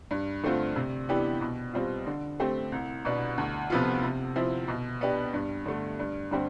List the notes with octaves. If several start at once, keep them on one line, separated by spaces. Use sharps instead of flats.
G2
D3 A3 C4 F4
C3
E3 B3 D4 G4
B2
G3 C4 F4
D3
A3 C4 G4
C2
B2 B3 D4
D2
C3 F3 B3 F4
C3
F3 C4 E4
B2
B3 D4 G4
G2
D3 A3
G2
D3 G3 C4 G4